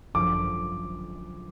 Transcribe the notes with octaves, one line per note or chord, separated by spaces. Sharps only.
G#1 F#2 D3 F3 D6